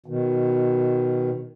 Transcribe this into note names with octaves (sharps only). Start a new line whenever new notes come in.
B2 D#3